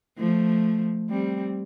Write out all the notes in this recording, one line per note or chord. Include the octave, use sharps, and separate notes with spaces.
F3 A3
G3 C4